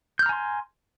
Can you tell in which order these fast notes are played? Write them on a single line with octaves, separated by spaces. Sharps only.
G6 F6 A#5 G#5 C6